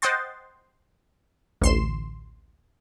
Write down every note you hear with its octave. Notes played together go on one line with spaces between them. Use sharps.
C5 D#5 F#5 G5 C6 A6
A1 D2 C6 C7 E7